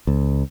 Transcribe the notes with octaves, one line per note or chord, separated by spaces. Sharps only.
C#2